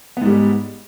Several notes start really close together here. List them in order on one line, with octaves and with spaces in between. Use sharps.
B3 G#2 G3 G#3